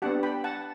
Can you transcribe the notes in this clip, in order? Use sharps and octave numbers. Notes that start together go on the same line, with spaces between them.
B3 D4 G4 F#5 A5
G5 B5
F#5 A5